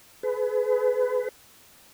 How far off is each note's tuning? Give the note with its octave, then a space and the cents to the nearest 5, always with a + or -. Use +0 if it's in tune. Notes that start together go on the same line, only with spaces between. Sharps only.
G#4 +35 B4 +30